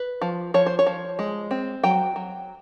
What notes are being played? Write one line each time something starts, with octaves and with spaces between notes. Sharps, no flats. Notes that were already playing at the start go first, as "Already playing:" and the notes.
Already playing: B4
F3
F3 C#5
C5
C#5
F3
G#3
C4
F#3 G5
F#3